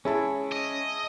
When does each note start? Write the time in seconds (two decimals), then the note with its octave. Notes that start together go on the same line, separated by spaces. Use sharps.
0.05 G#3 C#4 E4 A5
0.52 D#5